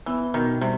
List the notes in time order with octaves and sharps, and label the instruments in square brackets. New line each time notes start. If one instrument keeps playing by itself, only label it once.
[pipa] E3 [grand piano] B3
[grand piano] B2 [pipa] D#3
[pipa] C3 [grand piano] G3